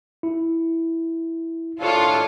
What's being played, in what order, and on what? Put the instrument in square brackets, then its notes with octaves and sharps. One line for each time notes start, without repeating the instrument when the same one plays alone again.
[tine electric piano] E4
[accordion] A2 D#3 D4 [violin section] F4 [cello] A4 C#5